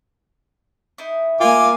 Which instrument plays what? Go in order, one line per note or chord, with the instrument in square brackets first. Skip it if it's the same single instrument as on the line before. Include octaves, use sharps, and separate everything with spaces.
[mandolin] D#4 E4
[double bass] A#3 [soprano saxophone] F4 [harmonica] G#5 D6